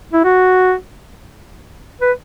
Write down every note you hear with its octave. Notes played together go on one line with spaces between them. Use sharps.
E4
F#4
B4